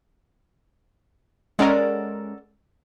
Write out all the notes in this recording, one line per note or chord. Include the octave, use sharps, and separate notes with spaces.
G#3 C#4 A4 A#4 D5 F#5